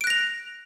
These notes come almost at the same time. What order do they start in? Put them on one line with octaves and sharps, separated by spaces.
D7 F#6 A#6 F7